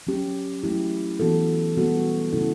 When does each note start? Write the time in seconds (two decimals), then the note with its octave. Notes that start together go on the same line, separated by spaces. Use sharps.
0.07 F#3 C#4 G4
0.63 F#3 A3 E4 G4
1.20 E3 B3 F#4 A4
1.77 G3 B3 F#4 A4
2.33 C#3 G3 C#4 E4 A4